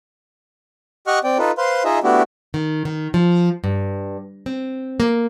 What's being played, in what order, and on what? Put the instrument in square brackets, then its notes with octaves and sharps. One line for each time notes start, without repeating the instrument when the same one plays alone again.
[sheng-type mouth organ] G4 D#5 F#5 C#6 F6 F#6
C4 D5 G5
D#4 F4 A4 B4
B4 C5 F5 C6
D#4 F4 G#4 D#5 E5
A3 B3 D4 E4 F#4 G4
[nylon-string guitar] D#3
D#3
F3
G2
C4
A#3